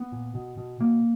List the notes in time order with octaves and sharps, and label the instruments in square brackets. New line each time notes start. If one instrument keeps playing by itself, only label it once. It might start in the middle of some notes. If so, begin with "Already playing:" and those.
Already playing: [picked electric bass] B3
A#2
B2
B2
B2 A#3